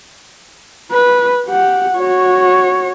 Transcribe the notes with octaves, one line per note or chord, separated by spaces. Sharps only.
B4
G4 F#5
F#4 C#5